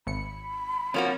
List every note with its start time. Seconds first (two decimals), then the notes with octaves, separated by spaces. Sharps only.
0.07 G#1 B5 C#7
0.94 F3 A#3 C4 F#4 C#5